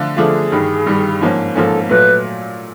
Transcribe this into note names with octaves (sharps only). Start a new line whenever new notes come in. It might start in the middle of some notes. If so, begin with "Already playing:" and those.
Already playing: D3 F3 A3 D4 F4
D3 F3 A3 D4 F4 G#4
G2 D#3 G3
G2 D#3 G3
G#2 F3 A#3 C#4
G#2 F3 A#3 C#4 A4
A#2 F#3 A3 B4